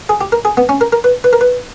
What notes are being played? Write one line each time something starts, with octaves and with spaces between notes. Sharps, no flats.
G#4
G4
A#4
G#4
B3
C#4
A#4
A#4
B4
B4
A#4
B4